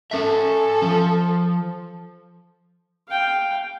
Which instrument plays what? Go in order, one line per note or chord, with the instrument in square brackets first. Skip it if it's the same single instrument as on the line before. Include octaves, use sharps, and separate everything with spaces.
[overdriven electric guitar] C#4 E5 [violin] A4
[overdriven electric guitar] F3
[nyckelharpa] F5 G5